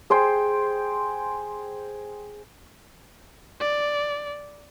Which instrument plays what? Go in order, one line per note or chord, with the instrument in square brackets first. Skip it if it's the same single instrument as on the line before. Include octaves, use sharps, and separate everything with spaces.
[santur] G#4 C5 G5 C6
[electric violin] D5